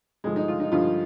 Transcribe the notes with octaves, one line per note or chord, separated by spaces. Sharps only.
G2 D3 F3 G#3
D#4
F4
D#4
G2 D3 F3 F4